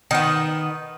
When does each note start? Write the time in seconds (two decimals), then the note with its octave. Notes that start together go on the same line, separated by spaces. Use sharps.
0.11 D#3 B3